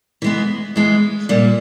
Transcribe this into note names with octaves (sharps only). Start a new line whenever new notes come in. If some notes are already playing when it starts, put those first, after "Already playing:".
E3 G#3 B3
E3 G#3 B3
A#2 G3 A#3